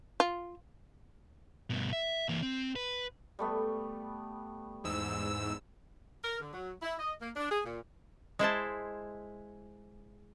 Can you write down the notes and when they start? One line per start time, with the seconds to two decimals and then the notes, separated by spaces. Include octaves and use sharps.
0.20 F4
1.70 G2 B2
1.93 E5
2.29 E3 A#3
2.42 C4
2.76 B4
3.39 G3 A3 B3
4.84 E2 G#2 G#4 E6
6.23 A#4
6.40 D3
6.53 F#3
6.82 E4
6.99 D#5
7.21 A#3
7.36 D4
7.50 G#4
7.65 A#2
8.39 G#3 E4 C5 A5